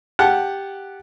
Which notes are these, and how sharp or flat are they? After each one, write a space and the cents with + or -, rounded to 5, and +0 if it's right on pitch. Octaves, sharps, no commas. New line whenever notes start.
G4 +0 F#5 +0 A5 -20